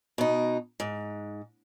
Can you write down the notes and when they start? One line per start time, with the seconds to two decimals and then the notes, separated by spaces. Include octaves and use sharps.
0.18 B2 D#4
0.80 G#2